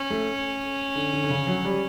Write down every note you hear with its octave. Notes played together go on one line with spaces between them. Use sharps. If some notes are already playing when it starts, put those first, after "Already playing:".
Already playing: C#4
A3
D3
D3
D3
C#3
F#3
G3